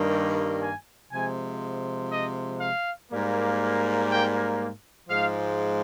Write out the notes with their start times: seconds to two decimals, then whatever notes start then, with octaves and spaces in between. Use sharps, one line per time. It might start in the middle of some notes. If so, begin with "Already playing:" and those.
Already playing: G2 D#3 G3 A#3
0.62 G#5
1.11 C3 F3 G#3 G#5
2.12 D#5
2.61 F5
3.12 G#2 G3 A#3
4.11 G5
5.10 G#2 F3 G#3 F5